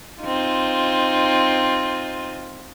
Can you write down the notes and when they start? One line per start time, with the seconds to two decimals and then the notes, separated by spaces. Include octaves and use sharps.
0.22 C4 D#4 F4